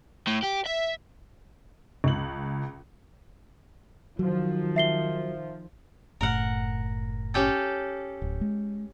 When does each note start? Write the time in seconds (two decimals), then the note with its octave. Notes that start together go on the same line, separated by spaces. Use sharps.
0.27 A2
0.43 G4
0.66 E5
2.04 C#2 F#7
4.19 D#3 F3 F#3
4.76 E5 C7 G7
6.21 F#1 A2 A#4 F#5
7.34 C#4 G4 A4
8.22 D1
8.41 G#3